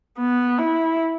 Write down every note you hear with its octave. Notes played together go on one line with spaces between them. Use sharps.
B3
E4